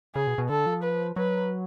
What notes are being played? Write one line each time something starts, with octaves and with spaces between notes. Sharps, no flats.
C#3 G#4
B2
B2
D3 A4
F3
B4
F#3 B4